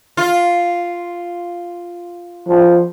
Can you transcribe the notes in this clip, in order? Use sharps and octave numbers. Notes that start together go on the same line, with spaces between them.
F4
F3